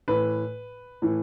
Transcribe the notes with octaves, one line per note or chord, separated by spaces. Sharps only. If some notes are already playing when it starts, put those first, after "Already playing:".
A2 E3 B4
A2 E3